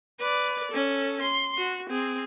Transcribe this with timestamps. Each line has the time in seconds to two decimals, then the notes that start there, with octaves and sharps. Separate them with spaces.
0.20 B4 D5
0.72 C#4 A4
1.22 C6
1.58 F#4
1.89 C4 G#4